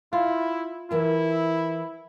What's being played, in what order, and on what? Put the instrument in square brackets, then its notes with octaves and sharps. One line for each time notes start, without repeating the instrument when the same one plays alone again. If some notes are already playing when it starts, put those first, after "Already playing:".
[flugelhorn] E4 [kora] F4
[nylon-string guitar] E3 A#4 A5 [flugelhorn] E4